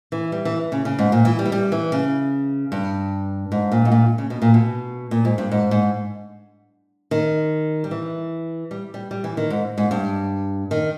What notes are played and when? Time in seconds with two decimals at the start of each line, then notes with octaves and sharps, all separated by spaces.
0.12 E3
0.32 G3
0.45 E3
0.72 C#3
0.85 C#3
0.99 G#2
1.12 A#2
1.25 E3
1.39 G3
1.46 E3
1.52 G3
1.72 E3
1.92 C#3
2.72 G2
3.52 G#2
3.72 A#2
3.85 G#2
3.92 A#2
4.18 C#3
4.30 B2
4.42 A#2
4.54 B2
5.11 A#2
5.25 G#2
5.38 G2
5.52 G#2
5.71 G#2
7.11 D#3
7.84 G3
7.91 E3
8.71 G3
8.94 G3
9.11 G3
9.24 E3
9.37 D#3
9.50 G#2
9.78 G#2
9.91 G2
10.71 D#3